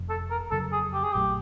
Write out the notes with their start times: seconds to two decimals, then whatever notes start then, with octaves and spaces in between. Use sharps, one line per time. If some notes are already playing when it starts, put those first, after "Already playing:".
Already playing: F1 F2 C3 F3
0.10 A4
0.30 A#4
0.51 F2 C#3 F#3 A4
0.72 G#4
0.94 G4
1.03 G#4
1.13 A#1 A#2 F#3 A3 G4